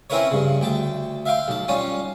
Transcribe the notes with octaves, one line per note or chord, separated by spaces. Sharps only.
C4 C#4 E4 A#4 B4 C#5
G2 C#3
D2 G5 A5
E5 F5 G5 C6
B1 A5
G3 C#4 F4